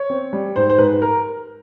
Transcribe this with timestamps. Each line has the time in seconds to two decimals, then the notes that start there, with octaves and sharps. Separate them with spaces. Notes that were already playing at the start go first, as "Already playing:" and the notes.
Already playing: C#5
0.10 C4
0.33 G3
0.56 G#2 C5
0.70 C5
0.78 G#2 B4
1.02 A#4